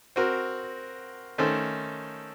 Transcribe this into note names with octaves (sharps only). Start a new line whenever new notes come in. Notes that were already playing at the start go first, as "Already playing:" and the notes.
C4 F#4 A#4
D#3 A3 C#4 A4 C5